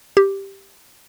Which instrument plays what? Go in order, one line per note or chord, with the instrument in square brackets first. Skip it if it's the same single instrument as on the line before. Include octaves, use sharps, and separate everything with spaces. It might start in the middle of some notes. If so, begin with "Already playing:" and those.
[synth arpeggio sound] G4